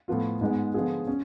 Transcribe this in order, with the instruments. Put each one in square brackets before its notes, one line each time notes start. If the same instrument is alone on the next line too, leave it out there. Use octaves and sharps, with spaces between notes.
[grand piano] A2 F3 B3 F4
G#2 G#3 B3
D3 F3 B3 F4 G#4
C#4